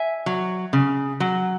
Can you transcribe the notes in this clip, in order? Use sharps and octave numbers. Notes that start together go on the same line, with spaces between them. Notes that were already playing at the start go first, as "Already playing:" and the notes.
Already playing: E5 G#5
F#3
C#3
F#3